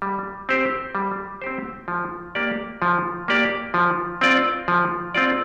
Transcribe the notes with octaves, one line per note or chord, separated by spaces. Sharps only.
G3
C4 G4 C5
G3
C4 G4 C5
F3
A#3 G4 D5
F3
A#3 G4 D5
F3
C4 F4 D5
F3
C4 F4 D5